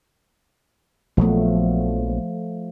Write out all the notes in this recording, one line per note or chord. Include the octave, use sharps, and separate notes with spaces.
A#1 F3 F#3 A3 B3